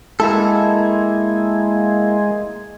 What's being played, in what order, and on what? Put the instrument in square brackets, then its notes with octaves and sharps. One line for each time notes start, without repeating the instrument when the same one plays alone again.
[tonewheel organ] G#3 [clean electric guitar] A#3 E4 A4